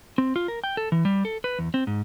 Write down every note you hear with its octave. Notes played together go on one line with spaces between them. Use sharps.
C4
F4
A#4
G5
A4
E3
G3
A4
B4
E2
C4
G#2